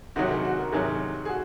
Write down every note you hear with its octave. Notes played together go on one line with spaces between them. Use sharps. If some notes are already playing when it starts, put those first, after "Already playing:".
C3 D#3 F#3 F#4
G#4
F#4
A#4
C3 D#3 F#3 G#4
G#4
F#4